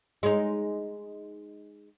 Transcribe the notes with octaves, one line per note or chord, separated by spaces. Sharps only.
G#3 D#4